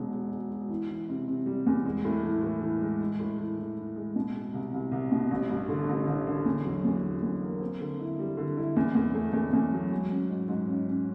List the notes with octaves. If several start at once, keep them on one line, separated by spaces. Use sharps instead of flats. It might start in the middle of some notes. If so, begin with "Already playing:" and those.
Already playing: E1 B2 G#3
G#3
G#3
G#3
E3
E3
C3
C3
G3
E2
G#3
A2
E3
A2
E3
G#3
G#3
A2
E3
E3
E3
G#3
B2
G#3
C2
C2
C2
B2
A1
G2
D3
A1
A1
D3
E2
F#3
E2
F#3
E2
A#3
C4
D3
E4
G3
D3
E4
E2
E2
A3
E2
E2
F#3
G#3
C#4
G#2
G#2
C#4
C#4